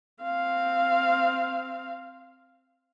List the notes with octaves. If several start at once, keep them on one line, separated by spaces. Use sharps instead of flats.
C4 F5